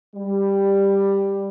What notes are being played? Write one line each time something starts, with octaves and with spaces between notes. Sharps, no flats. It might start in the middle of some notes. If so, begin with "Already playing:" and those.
G3